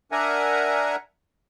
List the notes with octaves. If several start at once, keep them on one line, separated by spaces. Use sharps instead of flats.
D4 A#4 E5 F#5 G#5 A#5